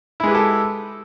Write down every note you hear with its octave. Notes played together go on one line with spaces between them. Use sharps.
G#3 E4 G4 A4 B4